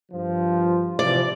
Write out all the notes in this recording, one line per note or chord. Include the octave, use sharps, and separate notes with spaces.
G2 F3
C3 E3 F3 D5